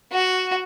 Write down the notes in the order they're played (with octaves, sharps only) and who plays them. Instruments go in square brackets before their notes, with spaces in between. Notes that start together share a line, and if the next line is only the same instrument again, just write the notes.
[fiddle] F#4